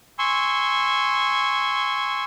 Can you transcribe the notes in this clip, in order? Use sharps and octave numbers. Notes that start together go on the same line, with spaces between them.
G#5 C6 C#6 E6